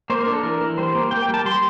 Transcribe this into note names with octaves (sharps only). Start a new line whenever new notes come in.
A#3 C5
A#4
D4
A4
E3 A#4
E3
G3 C5
A#3
A#3 G5
G5
G3
A5
G3 C6